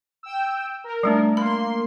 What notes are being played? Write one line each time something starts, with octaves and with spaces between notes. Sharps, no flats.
G5 E6
A#4
G3 A3 D4
A#3 B5 C6